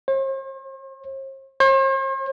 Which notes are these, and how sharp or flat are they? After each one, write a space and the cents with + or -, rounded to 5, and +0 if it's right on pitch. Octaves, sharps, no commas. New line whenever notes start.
C5 +45
C5 +45